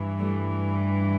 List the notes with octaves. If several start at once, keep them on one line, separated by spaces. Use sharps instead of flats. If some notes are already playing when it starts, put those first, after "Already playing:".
Already playing: G2 E3
G3 A3